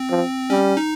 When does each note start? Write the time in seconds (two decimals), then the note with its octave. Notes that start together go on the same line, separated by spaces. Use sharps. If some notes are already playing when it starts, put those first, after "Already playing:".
Already playing: C4
0.10 F3
0.50 G3 C#4
0.77 D#4